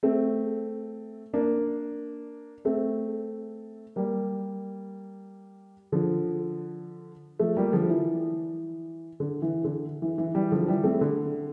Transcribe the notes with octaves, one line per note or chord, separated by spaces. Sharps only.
A3 C4
A#3 D4
A3 C4
G3 A#3
D3 F3
F3 A3
G3 A#3
D3 F3
E3
D3
E3
D3
E3
E3
E3 G3
D3 F3
E3 G3
A3 C4
D3